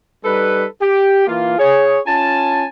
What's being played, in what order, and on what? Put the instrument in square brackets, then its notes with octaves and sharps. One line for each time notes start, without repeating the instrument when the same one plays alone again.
[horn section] G3 D#4 A4 B4
G4
E3 A#3 F4
G#4 C#5
C#4 F4 G#5 A5